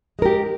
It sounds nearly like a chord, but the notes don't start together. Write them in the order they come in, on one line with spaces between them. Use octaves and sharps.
G#3 A#4 G4